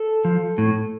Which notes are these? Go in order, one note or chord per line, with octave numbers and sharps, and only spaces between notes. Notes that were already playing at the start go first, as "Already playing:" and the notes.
Already playing: A4
F3
A2